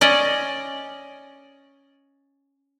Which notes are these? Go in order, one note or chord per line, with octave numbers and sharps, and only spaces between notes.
C#4 D5 D#5